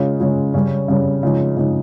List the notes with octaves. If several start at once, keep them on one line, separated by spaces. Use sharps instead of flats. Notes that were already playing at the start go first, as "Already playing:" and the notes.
Already playing: C#3 G#3 C#4 F4
C#3 G#3 C#4 F4
C#3 G3 C#4
C#3 G3 C#4
C#3 F3 G#3 D#4
C#3 F3 G#3 D#4